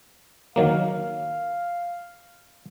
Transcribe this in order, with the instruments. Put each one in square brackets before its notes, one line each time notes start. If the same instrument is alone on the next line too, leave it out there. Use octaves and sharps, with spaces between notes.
[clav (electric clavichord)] D#3 F#3 A#3 [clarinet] F5